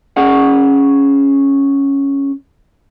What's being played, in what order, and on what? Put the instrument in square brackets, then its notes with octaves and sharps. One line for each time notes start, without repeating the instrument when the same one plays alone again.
[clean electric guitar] C#4 G#4 F#5